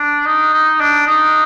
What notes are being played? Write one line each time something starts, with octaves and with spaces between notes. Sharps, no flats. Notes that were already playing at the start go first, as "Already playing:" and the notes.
Already playing: D4
D#4
D#4
D4
D#4